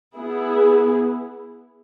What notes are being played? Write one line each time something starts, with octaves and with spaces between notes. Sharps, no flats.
B3 E4 G#4